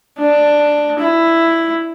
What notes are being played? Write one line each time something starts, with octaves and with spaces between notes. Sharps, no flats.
D4
E4